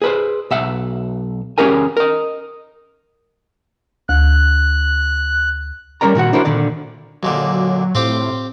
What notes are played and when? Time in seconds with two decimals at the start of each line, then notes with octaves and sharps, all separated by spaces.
0.02 G#4 B4 C5
0.51 B1 E5 F#5
1.58 C#4 G4 G#4 A#4 G#5
1.97 A#4 D#5
4.09 D2 F#6
6.01 G3 C#4 A#4 D5 A#5
6.15 A#2 D#3 F#4 F#5
6.33 D4 E4 F#4 A#4 C5 D5
6.45 A#2 D3 D#3 D5
7.23 D#2 A#2 D3 F#3
7.95 A2 C4 F4 G4